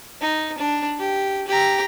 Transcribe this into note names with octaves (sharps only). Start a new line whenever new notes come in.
D#4
D4
G4
G4 A#5